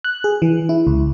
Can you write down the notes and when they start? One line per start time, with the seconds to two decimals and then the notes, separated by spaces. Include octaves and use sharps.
0.04 F#6
0.24 G#4
0.42 E3
0.69 E4
0.87 C#2